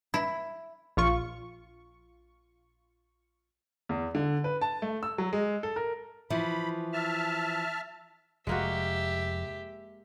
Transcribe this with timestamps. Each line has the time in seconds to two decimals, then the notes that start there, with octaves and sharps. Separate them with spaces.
0.14 E4
0.97 A#1 F4 C#6
3.89 E2
4.15 D3
4.44 B4
4.61 A5
4.82 A3
5.03 E6
5.18 F#3
5.33 G#3
5.63 A4
5.76 A#4
6.30 E3 F3 B5
6.93 E5 A5 F6
8.47 F1 G#3 A#3 F#4 G4 E5